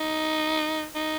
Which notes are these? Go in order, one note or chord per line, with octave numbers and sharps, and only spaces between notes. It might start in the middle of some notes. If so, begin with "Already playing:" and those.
Already playing: D#4
D#4